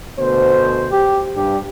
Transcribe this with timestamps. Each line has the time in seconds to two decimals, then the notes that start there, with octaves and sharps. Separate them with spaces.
0.19 D2 B2 C5
0.92 G4
1.36 G2 G4